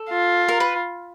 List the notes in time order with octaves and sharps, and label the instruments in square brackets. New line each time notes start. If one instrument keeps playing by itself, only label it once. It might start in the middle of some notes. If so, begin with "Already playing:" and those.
Already playing: [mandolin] A4
[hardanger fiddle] F4
[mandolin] A#4
B4